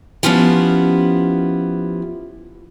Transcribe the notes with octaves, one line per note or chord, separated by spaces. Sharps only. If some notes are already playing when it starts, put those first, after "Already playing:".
F3 B3 C#4 E4 F4 G4